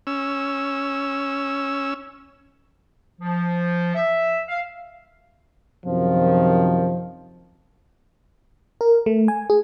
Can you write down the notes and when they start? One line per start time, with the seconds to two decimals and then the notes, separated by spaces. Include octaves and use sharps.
0.07 C#4 E6
3.21 F3
3.95 E5
4.48 F5
5.86 F#2 C3 D#3 F3
8.81 A#4
9.06 A3
9.28 G#5
9.50 G#4